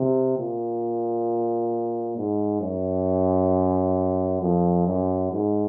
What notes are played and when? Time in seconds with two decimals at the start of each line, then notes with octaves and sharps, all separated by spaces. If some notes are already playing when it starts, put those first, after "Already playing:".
Already playing: C3
0.37 A#2
2.17 G#2
2.61 F#2
4.42 F2
4.86 F#2
5.32 G#2